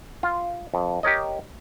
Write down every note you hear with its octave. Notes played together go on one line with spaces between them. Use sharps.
F4
F2
G4 A#4 C#5 D#5